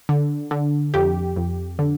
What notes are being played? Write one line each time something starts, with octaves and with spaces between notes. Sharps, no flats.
D3
D3
F2 G4
F2
D3